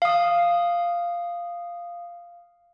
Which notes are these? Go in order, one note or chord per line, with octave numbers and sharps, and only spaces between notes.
F5 D#6